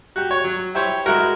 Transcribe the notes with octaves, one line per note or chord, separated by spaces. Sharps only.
F#4 G4
C#5
F#3
E4 G4 C5 C#5
G#3 E4 F#4 A#4